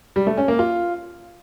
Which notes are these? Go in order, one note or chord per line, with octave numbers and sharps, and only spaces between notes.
G3
A3
C#4
A#3
F4